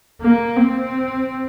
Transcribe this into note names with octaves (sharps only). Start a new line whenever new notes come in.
A#3
C4